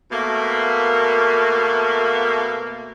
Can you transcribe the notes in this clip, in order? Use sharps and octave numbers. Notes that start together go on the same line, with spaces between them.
B2 A3 A#3